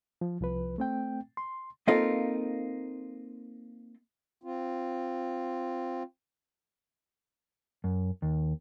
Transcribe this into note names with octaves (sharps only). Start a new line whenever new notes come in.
F3
C2 F3 B4
A3 C4 G5
C6
A#3 C4 D#4 F4 A4 A#4
C4 F4
F#2
D#2